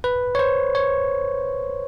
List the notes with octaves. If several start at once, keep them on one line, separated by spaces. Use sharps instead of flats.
B4
C#5
C5
C#5